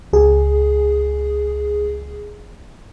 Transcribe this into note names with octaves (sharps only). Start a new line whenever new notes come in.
C#2 G#4